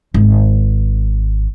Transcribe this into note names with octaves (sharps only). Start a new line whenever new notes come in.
G#1